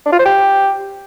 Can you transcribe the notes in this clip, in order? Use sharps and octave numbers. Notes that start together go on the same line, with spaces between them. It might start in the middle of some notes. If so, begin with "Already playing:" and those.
D4
F4
C5
G4